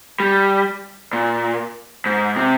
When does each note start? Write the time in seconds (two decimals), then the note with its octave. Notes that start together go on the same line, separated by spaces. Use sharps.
0.20 G3
1.13 A#2
2.06 G#2
2.36 C3